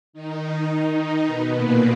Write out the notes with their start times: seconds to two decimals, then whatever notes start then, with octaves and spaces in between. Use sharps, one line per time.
0.13 D#3 D#4
1.26 B2 B3
1.54 A#2 A#3